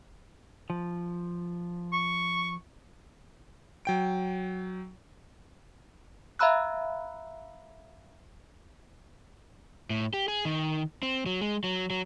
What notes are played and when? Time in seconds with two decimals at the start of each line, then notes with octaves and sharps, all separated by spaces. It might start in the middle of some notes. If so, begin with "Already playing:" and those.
0.70 F3
1.93 C#6
3.85 F#3 G5 D7
6.39 E5 F5 A#5 B5 E6 F#6
9.90 A2
10.14 G4
10.28 G#4
10.45 D#3
11.03 C4
11.26 F#3
11.41 G#3
11.64 F#3
11.90 F#3